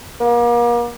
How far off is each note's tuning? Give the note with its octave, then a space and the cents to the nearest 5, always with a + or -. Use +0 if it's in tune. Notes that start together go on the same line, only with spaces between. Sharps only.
A#3 +40